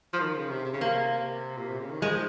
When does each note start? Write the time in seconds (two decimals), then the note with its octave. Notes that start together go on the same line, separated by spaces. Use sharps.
0.13 F3
0.20 D#3
0.35 C#3
0.50 C3
0.65 C3
0.73 C#3
0.81 C3 A#3
1.57 A#2
1.68 C3
1.80 C#3
1.90 D#3
2.02 F3 G#3